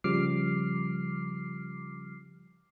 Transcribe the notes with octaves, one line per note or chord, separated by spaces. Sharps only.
C#3 F3 G3 D6 F6 C7